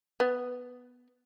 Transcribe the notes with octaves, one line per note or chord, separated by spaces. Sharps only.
B3